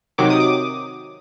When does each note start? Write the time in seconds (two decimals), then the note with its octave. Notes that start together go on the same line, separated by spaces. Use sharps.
0.18 C3 D#3 F#3 D6
0.30 D#6
0.40 D6